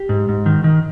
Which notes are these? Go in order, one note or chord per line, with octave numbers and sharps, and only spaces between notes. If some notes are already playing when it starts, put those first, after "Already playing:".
Already playing: G4
G#2
G#2
D#3
D#3